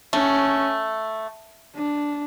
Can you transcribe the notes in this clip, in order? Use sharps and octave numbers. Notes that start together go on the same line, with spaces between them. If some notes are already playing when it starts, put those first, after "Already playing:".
A3 C#4
D4